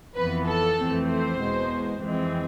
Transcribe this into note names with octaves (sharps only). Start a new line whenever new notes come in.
F2 E3 B3 B4
A4
F2 E3 A3 C4
C5
E2 B2 G#3
F2 E3 G#3 C4